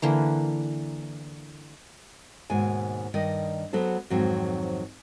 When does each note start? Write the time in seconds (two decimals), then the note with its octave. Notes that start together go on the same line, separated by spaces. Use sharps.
0.02 D3 E3 A#3
2.50 D#2 G#2 B2 G#5
3.14 G2 D#3 D5 D#5
3.73 F#3 B3 F#4 A4 C5
4.10 F2 G#2 D#3 F#3 C4